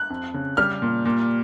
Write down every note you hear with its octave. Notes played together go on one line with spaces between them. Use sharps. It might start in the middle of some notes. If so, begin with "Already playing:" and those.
Already playing: F#6
F2
C#3
G3 F6
A#2
A#2